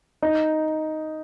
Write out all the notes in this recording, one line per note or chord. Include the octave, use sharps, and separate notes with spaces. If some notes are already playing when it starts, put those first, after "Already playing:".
D#4